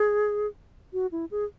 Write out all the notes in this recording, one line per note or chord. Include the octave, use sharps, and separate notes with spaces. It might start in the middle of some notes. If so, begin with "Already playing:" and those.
Already playing: G#4
F#4
E4
G#4